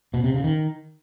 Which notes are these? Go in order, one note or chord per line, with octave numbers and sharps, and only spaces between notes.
B2
C3
C#3
D#3